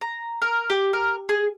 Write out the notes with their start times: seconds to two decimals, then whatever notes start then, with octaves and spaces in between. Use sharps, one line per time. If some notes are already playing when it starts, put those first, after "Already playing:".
0.01 A#5
0.42 A#4
0.70 G4
0.93 A#4
1.29 G#4